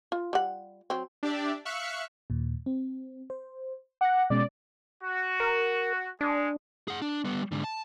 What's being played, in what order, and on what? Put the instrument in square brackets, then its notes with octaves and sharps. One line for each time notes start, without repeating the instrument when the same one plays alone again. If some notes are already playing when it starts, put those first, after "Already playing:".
[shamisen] F4
G3 F#5
F#3 C4
[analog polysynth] D4 G4 D5 E5
E5 F5 C#6 F#6 C#7
[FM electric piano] D#2 A#2
C4
C5
[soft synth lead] F#5 [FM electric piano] D6 A#6
[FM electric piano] B2 G#3 C#4 [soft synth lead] D5
[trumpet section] F#4
[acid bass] A#4
[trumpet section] G#3 [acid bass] D4
[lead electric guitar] G#4 F#5
D4
G3 B3
G#2 D3
A5